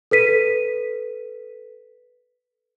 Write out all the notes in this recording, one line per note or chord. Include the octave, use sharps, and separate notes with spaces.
A4 B4 B6 D#7